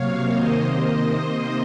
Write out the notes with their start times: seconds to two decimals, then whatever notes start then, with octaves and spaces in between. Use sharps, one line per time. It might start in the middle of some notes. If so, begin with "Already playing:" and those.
Already playing: C3 F#3 A#3 C#5 F5
0.29 C3 D#3 A#3 C5 D#5